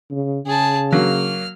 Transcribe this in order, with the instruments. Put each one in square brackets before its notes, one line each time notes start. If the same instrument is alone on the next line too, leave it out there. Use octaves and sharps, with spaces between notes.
[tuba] C#3
[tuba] C#3 [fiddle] G#4 A5
[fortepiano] F#3 A#3 [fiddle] F6